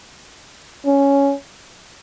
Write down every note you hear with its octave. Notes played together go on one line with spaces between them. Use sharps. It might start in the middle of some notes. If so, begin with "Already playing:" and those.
C#4